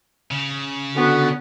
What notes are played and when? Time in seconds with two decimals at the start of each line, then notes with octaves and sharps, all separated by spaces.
0.31 C#3
0.95 D3 B3 F#4